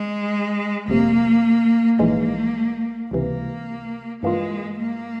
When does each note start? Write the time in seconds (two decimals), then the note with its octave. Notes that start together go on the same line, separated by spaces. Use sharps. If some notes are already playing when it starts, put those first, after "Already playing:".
Already playing: G#3
0.88 G1 F2 C3 A#3
1.99 A#1 G#2 E3 G#3 A#3
3.11 C#2 C3 E3 A#3
4.23 G2 E3 G#3 A#3 F4
4.79 A#3